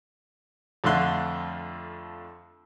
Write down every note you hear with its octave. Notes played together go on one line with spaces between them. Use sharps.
F2 D3 A3 F4 C6 F#6